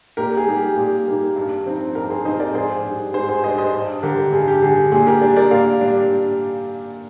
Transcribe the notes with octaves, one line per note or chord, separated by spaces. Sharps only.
A#2 G4 A#4
G#4
G3 A#3 D#4
G4
A#2 G#4
G3 A#3 D#4
G2
F3 C4 D#4
G2 G4 A#4
G#4 C5
F3 C4 D#4 C5 D#5
A#4 D5
G#2 G#4 C5
G3 D4
G#2 G#4 C5
G#4 C5
G3 D4 C5 D#5
C5 D#5
G2
D3 G3 G4 A#4
G2 G#4
G4
D3 G3 G#4
G4
A#2 G#4
G4 A#4
G3 D4
A#4 D5
A#2 D5 F5
G3 D4